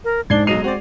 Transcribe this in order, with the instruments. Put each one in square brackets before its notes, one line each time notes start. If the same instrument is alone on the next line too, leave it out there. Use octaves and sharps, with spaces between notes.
[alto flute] A#4
[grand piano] G#2 [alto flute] D4 [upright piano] G#6 C7 G7
[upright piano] B1 F#3 C7 [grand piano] G#3 D#7 F7 [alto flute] D#5
[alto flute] C4 [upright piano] F#4 D5